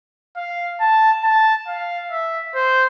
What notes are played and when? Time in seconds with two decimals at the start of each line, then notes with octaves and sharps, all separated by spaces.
0.36 F5
0.80 A5
1.24 A5
1.68 F5
2.11 E5
2.55 C5